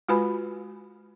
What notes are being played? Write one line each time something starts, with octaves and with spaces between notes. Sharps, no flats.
G#3 F4 F#4 B4 G#5 B5